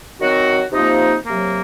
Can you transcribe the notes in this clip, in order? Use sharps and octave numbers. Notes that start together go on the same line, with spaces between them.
D#3 F#3 C4 F#4
C3 F3 A#3 D#4
C3 F#3 A#3